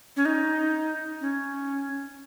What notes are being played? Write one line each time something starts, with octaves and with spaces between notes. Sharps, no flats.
C#4
D#4
C#4